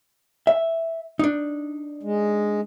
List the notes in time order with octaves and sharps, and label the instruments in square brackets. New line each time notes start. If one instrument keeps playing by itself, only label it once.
[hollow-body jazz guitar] E5
D4 D#4
[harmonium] G#3